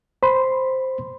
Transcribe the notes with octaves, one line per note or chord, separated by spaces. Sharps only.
C5 B5 C6